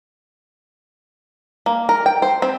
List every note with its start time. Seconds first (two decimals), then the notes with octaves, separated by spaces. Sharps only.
1.66 A#3
1.89 A#4
2.06 G5
2.22 C5
2.42 C4